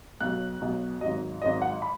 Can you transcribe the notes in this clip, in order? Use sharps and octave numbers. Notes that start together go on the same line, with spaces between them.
B1 B2 F#3 F#6
B1 B2 F#3
G#1 G#2 F#3 D#5
G#1 G#2 F#3 D#5
F#5
B5